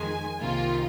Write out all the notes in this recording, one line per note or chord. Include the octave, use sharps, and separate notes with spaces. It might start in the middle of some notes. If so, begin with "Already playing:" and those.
Already playing: F2 D#3 G#3 G#5
C2 C3 D#3 A#3 F4